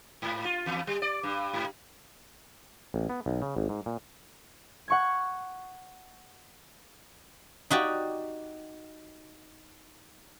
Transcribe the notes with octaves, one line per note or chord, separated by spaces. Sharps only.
G#2
F4
E2
G3
D5
G2
G#2
A1
B3
B1
C#3
G#1
G#2
A#2
F#5 C#6 G#6
D#4 F#4 G4 D5